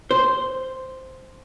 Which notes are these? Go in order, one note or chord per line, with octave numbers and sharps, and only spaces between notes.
C5